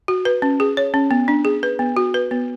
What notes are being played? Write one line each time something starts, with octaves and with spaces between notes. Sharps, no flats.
F#4
B4
C#4
G#4
C#5
C#4
B3
D4
G#4
B4
B3
F#4
B4
B3